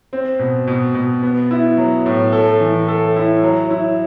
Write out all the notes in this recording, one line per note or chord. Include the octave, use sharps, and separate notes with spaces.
C4
B2
B2
B2
B3
E4
F#3
A2
A4
E3
A4
E4
F#3
E4